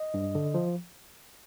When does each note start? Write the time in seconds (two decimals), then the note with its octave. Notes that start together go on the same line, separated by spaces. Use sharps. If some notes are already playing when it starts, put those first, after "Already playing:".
Already playing: D#5
0.14 G2
0.35 D3
0.54 F3